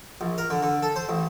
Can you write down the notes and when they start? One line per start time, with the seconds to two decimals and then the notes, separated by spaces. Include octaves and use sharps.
0.21 A#1
0.38 A#4
0.50 D3
0.63 D3
0.83 A4
0.96 C5
1.09 A1